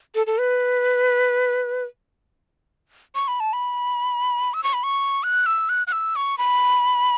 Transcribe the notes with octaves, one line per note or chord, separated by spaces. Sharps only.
A4
A4
B4
C#6
B5
A5
B5
E6
C#6
B5
C#6
F#6
E6
F#6
F#6
E6
C#6
B5